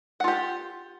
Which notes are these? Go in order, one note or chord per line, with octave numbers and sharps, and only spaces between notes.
F4 G4 F#5